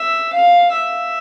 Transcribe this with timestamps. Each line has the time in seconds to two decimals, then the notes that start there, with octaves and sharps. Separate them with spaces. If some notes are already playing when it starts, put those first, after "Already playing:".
Already playing: E5
0.33 F5
0.72 E5